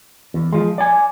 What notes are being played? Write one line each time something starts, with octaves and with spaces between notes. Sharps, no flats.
E2
F3 G#3
D5 G#5